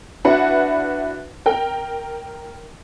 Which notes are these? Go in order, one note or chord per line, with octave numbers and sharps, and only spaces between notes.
D4 E4 F#4 B4 F#5
A#4 G5